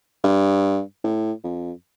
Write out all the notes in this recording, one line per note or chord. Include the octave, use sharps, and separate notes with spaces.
G2
A2
F2